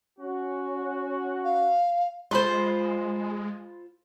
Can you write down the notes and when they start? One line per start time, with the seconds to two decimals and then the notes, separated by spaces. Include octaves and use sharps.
0.19 C#4 F#4
1.44 F5
2.31 G#3 F4 A4 C5 B5 C6